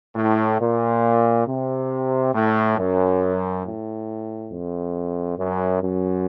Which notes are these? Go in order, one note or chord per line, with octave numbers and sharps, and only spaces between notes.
A2
A#2
C3
A2
F#2
A2
F2
F#2
F#2